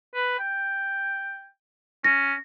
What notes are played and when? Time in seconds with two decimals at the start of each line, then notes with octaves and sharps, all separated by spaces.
0.15 B4
0.39 G5
2.04 C#4 A#6